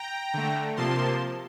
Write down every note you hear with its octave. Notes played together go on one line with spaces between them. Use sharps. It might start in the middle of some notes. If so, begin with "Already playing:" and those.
Already playing: G5 A#5
D3 A3
C3 F3 A#3 A5 C6